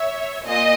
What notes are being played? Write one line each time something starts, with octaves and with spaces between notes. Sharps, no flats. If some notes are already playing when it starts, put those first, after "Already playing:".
Already playing: C#5 E5
A#2 D#5